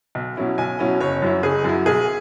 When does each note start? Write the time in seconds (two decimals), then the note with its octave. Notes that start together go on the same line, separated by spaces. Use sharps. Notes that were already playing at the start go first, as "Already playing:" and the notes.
0.15 B1
0.37 B2 F#3 C#4 E4
0.58 B1 G#5
0.79 B2 F#3 C#4 E4
1.01 F#1 C#5
1.22 F#2 F#3 E4
1.43 F#1 G#4
1.64 F#2 F#3 E4
1.86 B1 G#4